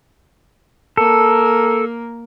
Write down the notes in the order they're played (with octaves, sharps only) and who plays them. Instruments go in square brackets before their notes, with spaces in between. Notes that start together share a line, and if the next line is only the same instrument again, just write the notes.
[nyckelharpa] A#3 A#4 [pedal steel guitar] A4